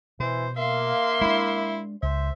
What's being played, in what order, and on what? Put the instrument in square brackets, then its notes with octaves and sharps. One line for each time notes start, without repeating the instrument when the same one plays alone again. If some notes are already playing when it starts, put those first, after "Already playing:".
[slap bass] B2 [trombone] E3 [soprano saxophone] C5
[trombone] A#3 [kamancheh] E5 C6 [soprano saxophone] F5
[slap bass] G#3 D4 [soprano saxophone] E4
[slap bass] C#2 [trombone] C5 [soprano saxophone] E5